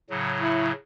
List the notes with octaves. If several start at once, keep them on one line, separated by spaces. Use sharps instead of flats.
A2 C#3 F#3
E4